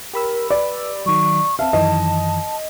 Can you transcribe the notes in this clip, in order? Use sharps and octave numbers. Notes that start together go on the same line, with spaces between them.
G4 A#4 B5 E6
B4 D5
D#3 F#3 C#6
C4 E5 F5 A5
F#2 D#3 E3 D#5